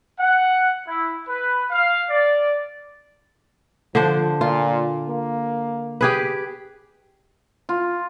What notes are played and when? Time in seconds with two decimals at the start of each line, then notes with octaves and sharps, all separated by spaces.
0.20 F#5
0.87 E4
1.28 B4
1.70 F5
2.10 D5
3.95 D3 F3 D4 C5
4.41 A#2 F4
5.09 A#3
6.01 G4 G#4 B4
7.69 F4